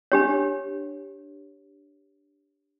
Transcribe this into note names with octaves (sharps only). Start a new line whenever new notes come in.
D4 G4 C#5